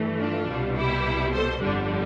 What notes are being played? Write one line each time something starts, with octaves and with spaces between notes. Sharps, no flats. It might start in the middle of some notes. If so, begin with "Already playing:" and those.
Already playing: G2 E3 A3
D4 F4
C2 B2 G3
E4 G4
A4 C5
G1 F2 D3 G3 D4